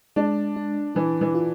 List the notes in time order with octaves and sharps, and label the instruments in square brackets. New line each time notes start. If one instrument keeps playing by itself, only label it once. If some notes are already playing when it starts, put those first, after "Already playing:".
[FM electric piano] G#3 [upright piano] D4
[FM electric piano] D4
[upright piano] E3 [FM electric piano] D4
[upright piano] E3
[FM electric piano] F4